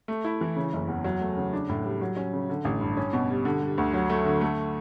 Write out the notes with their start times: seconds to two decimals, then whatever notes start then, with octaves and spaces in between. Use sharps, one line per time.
0.08 A3
0.24 E4
0.41 E3
0.56 C#3
0.73 F#1
0.88 E2
1.04 F#3
1.21 A3
1.37 C#3
1.53 D4
1.69 A2
1.84 G3
2.01 F#3
2.16 C#4
2.33 C#3
2.49 D3
2.65 A1
2.81 G2
2.97 C#4
3.13 B2
3.30 G3
3.45 D3
3.62 G3
3.78 D2
3.94 F#3
4.10 A3
4.25 D3
4.41 A3